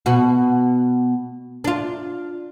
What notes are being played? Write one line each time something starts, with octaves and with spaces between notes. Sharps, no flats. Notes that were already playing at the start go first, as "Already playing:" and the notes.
B2 F#4
D4 F4